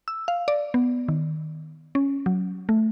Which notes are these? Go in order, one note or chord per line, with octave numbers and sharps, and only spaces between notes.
E6
F5
D5
B3
D#3
C#4
F#3
A3